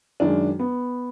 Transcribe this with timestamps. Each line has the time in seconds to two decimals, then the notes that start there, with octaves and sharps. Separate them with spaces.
0.20 F#2 D#3 G#3 D4
0.59 B3